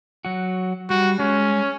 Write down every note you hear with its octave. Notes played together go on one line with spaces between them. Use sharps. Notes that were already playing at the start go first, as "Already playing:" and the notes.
F#3 F#4
G3 F#4
G#3 C#4